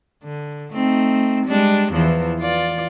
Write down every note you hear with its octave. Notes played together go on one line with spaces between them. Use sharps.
D3
A3 C4 D#4
G3 G#3 D4
E2 E3 F3
F4 D5